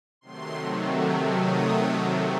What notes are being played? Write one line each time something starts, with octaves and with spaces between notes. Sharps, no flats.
C3 D#3 F#3 A3 C6
D#6